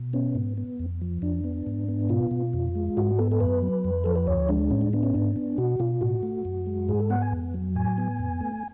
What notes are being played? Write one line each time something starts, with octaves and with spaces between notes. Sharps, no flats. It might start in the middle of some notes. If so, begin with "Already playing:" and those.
Already playing: B2
B3 C#4
G#2
B3
F2
F3
F2 D4
B3
G#2
B3
B2 F4
B2
F2
G#3
G#2 F#4
B3 A4
A4
F#2 B4
F#3
F2
F3 A4
B4
D2 C#5
G#3 D4
A2 C#4
D4
B3 D4
C#4
G#2 D4
B3
B2 F#4
B2 F4
A2 F#4
A3
F#2
G#3
G#2 G#4
A4
B3 F#5
G#5
F2
F#3
A2 G#5
B3
F2
A3